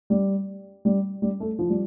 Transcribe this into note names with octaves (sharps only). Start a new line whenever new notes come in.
G3
G3
G3
A3
F3
G3